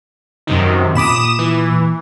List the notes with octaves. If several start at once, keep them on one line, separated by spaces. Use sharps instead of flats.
F#2 C3 D#3
A#2 B5 D6 D#6 E7
E3